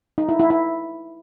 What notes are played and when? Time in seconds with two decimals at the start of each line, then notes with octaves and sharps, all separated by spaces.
0.18 D#4
0.29 E4
0.39 E4
0.50 E4